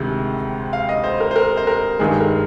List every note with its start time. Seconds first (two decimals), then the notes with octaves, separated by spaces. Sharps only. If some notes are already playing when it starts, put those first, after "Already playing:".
Already playing: D2 C3 D#3 G#3
0.73 F5
0.89 D#5
1.04 C5
1.20 A#4
1.31 C5
1.36 A#4
1.57 C5
1.67 A#4
1.99 G2 D#3 G#3 G#4
2.21 A#4